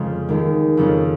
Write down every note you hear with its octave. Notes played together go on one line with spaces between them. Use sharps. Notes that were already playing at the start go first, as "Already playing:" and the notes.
Already playing: F2 C#3 F3 G#3 C#4
D#2 D#3 G#3
F2 C#3 F3 G#3 C#4